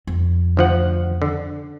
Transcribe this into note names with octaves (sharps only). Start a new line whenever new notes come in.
F2
D2 F3 F#5
D3